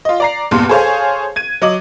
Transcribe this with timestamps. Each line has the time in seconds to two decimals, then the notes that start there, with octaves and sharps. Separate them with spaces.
0.05 F4 D#5
0.20 D5 A#5 C7
0.51 E2 G2 A#2 C6
0.69 G#4 A4 C5 C#5 F5 G#5
1.36 G#6 D#7
1.62 F#3 D#5 D6 F#7